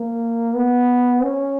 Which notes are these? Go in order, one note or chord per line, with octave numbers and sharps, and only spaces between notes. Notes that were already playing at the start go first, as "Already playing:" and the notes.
Already playing: A#3
B3
C#4